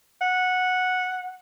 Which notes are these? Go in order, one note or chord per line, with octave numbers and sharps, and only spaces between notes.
F#5